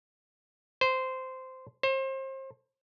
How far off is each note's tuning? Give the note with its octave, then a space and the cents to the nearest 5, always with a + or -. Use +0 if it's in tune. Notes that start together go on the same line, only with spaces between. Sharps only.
C5 -10
C5 +35